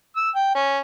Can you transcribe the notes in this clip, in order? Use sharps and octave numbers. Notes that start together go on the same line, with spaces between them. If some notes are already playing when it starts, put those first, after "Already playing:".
E6
G5
C#4